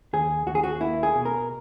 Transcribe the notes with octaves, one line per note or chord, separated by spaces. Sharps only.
D#2 G#4
D#2 F#4
G#4
F#4
A#3 E4
G#4
B2
A#4